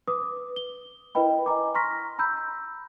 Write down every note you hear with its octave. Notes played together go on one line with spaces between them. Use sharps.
B4 D6 D#6
G7
E4 A#4 B4 D#5 G5 B5
D#5 G#5 A#5 D6
A#5 C6 C#6 F6 A#6 B6
A#5 B5 E6 G6